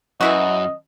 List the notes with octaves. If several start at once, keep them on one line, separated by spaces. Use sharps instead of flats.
F#2 E3 E4 F#4 D#5